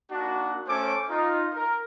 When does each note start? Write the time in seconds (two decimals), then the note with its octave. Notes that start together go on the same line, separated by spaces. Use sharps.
0.11 A#3 D4 D#4 F#4
0.67 A3 C#4 A4 C5 G#5 D6
1.09 D#4 F4
1.53 A#4